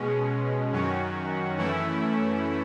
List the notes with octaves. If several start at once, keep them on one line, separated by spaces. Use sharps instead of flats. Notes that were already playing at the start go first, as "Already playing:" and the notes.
Already playing: B2 G#3 C#4
F#2 D#3 F#3 C#4 F#4
F#2 E3 A3 C#4 E4